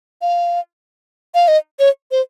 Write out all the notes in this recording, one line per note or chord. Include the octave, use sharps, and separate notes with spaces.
F5
F5
D#5
C#5
C5